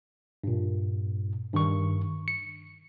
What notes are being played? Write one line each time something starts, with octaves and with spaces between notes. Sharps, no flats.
G2 A#2
G2 D#3 C#6
C#7